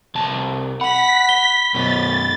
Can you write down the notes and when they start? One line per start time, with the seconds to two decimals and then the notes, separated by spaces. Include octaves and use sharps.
0.15 C2 A5
0.81 F#5 B5 B6 F#7
1.29 G7
1.74 F#2 B2 A6